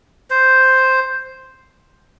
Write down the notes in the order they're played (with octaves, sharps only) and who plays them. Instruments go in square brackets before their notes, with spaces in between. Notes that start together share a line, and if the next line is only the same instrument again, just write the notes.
[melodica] C5